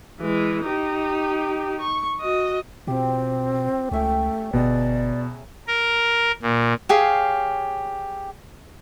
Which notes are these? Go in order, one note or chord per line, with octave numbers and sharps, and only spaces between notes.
E3 G#3
D#4 G4
C#6
F#4 D#5
B2 F3 C4 G4
C#2 A3 C#4 E5 G5
G1 B2 G#4 D5 A#5 E6
A#4
A#2
G4 G#4 C#5 F5